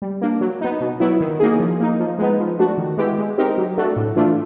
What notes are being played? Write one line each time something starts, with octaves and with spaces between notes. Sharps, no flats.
G3
A#3 D4
F#3
B3 D#4
B2
F#3 B3 E4
D#3
F#3 A#3 D#4 G#4
F3
A#3 D#4
F3
G#3 B3 D#4
F3
A3 D4 F#4
D#3
G#3 B3 E4 G4
G#3
C4 D#4 G4 A#4
F#3
A3 D4 F#4 A4
A2
E3 A3 D4 F4